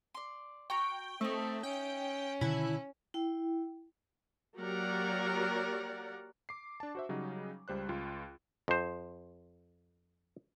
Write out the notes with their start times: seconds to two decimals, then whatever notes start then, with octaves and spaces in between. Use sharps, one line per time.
0.14 D5 C6
0.70 F#4 G5 A#5 C#6
1.21 A3 C4 D#4 E5
1.63 C#4 G5
2.41 B2 D3 D#3 E4 F#5 A5 B5
3.14 E4 G5
4.57 F#3 A#3 G4 A#4 D5 F#5
6.49 D6 C7
6.80 D4 A5
6.95 F#4 C5 E5
7.09 C#3 F#3 G3 D#4
7.68 C#2 G3 C5 F#6
7.89 C#2 F4
8.68 F2 C5